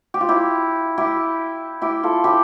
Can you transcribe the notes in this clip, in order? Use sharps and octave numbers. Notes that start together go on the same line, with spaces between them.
G4
F4
E4 G4
E4 G4
E4 G4
F4 A4
E4 G4